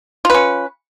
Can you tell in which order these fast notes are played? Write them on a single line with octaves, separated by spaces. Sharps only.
F4 B4 C#4